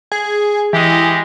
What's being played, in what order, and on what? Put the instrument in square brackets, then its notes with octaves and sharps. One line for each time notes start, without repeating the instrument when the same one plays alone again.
[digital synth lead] G#4
[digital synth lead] E3 [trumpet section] G#3 G4 D#5